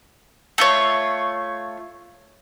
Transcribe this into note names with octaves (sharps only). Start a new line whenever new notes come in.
A3 F4 C#5